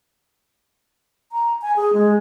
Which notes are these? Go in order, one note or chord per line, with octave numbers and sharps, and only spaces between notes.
A#5
G#5
G#4
G#3